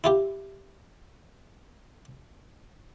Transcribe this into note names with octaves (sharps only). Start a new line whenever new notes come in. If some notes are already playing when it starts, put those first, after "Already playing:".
E4 F4 G4